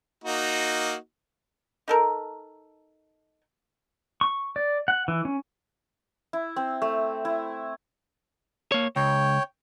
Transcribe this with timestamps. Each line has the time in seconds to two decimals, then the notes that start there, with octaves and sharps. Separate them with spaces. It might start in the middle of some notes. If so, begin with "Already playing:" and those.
0.24 A#3 D#4 F#4
1.88 D#4 A4 A#4
4.21 C#6
4.56 D5
4.88 F#5
5.08 E3
5.25 C#4
6.33 E4
6.56 C4
6.82 A3
7.25 E4
8.72 A#3 C#5
8.96 C#2 C#5 G5